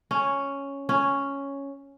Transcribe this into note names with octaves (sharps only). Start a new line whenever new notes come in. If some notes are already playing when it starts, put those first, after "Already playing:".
C#4
C#4